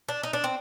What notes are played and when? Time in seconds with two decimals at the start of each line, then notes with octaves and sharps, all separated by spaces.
0.09 D4
0.23 D#4
0.33 D4
0.44 C4